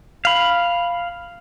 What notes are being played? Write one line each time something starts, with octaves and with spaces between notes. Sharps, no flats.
F5 B5